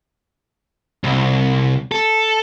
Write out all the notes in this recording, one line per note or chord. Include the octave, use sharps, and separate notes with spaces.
C2
A4